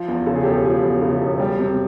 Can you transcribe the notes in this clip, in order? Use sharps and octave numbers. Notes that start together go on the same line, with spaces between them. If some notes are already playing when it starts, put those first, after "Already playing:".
Already playing: F3
E2
C#3 A4
G#4
E1 G4 A4
F3 G#4
E2
C#3
E1
G3
C3